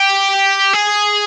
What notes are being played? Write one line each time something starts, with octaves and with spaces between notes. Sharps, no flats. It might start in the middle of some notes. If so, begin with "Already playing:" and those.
Already playing: G4
G#4